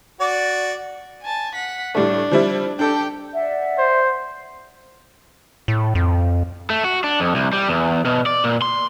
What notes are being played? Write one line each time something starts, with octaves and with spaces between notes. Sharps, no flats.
F#4 D5
G#5 A5
F#5 B6
A2 G3 A3 D4
F3 G3 E4
D4 G4 A4 G5
D5 E5 F#5
C5
A2
F2
A3
F#4
D4
F2
C2
G3
E2
B2
D5
A#2
C6